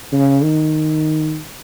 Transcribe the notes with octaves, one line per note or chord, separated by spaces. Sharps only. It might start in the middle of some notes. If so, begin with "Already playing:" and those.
C#3
D#3